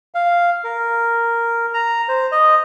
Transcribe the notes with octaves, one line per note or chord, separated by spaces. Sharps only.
F5
A#4
A#5
C5
D#5